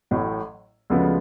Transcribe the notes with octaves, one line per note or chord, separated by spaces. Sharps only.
A1 A2 F#3
D2 C#3 F3 G#3 B3